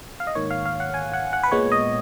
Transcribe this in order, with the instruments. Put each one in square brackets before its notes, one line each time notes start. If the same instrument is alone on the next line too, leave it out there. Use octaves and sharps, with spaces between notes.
[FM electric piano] F5
D#5
G#2 D#3 A#3 C#5
F5
F5
F#5
G#5
F#5
F#5
B4
A#2 G#3 B3 C#5
D#5